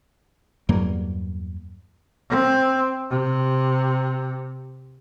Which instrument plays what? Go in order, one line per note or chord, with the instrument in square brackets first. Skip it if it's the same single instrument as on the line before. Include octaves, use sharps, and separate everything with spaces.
[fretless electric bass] E2 G2 F#3 A#3
[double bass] C4
C3